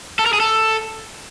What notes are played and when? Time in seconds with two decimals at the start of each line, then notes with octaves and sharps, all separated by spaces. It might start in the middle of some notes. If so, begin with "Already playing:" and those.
0.19 A4
0.26 A#4
0.33 G#4
0.40 A4